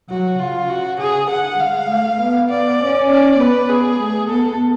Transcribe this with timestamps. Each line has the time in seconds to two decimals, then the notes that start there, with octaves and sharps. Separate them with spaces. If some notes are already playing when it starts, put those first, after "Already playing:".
0.10 F#3 F#4
0.40 C#3 F4
0.70 F#4
1.00 C#3 G#4
1.31 D3 F#5
1.60 G#3 F5
1.90 A3
2.20 B3
2.50 D5
2.80 C#4
3.10 D5
3.40 B3 B4
3.70 B3 G#4
4.00 A3
4.30 B3 A4